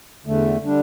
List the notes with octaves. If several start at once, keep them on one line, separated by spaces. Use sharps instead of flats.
E2 D3 A3
D3 G3 D4